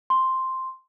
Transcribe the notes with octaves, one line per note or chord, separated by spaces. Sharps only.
C6